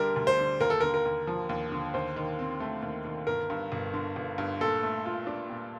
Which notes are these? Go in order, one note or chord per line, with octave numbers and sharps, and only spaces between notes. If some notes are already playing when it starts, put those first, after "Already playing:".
Already playing: D2 D3 G3 D4 A#4
D2
C5
D3
D#2 A#4
A4
D3 A#4
A#4
D#2
F3
D#2
D3
D#2 C5
D#3
C4
A3
D#2
D#3
G1 A#4
G2
G1
D3
G1
G2
A#2 A4
A3
F4
D4
A#2